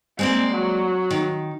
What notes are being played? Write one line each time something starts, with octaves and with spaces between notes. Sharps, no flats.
G#3 A#3 C4 D5
F#3
D#3